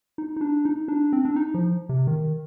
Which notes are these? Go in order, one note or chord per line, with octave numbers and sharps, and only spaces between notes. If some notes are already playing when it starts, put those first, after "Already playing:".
D#4
D#4
D4
D#4
D4
C4
D4
D#4
F3
C3
D#3